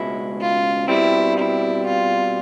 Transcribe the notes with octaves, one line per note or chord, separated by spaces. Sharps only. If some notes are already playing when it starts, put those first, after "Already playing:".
Already playing: C#2 B2 G#3 C#4 E4
F4
B2 G3 C4 E4
E4
F4